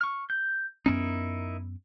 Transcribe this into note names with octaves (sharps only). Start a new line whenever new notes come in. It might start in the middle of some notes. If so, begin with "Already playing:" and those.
C#6 F6
G6
F#2 B3 C#4 D#4 E4 A#4